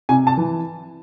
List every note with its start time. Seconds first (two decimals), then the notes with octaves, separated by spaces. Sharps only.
0.09 C3 G#5
0.27 A5
0.37 E3